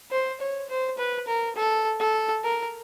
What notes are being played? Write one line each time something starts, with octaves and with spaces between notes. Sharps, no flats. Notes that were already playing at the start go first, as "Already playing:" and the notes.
C5
C#5
C5
B4
A#4
A4
A4
A#4